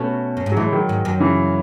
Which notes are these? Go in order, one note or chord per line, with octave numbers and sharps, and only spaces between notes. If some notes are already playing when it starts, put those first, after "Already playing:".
Already playing: B2 A3 C#4
F#2
G#2
F#3
A2 E3 G#3
D#3 F#3
G#2
F#2
C#3 E3